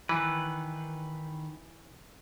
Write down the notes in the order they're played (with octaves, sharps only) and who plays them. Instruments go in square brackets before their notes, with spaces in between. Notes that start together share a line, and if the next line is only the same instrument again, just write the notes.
[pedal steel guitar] D#3 B4 [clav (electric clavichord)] E3